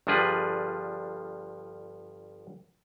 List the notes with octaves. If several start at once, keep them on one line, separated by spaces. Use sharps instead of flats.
G1 G2 F3 D4 G#4 B4